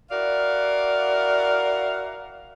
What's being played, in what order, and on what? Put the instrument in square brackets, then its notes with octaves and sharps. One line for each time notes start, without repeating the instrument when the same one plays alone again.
[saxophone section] E4 F#4 A#4 D5 F5